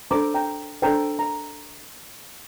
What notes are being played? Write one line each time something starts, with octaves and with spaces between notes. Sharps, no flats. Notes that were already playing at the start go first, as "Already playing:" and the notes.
D4 A4 C5 A#5 D6
G5 A#5
D4 A4 C5 G5 A#5
A#5